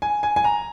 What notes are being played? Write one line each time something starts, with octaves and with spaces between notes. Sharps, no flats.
G#5
G#5
G#5
A#5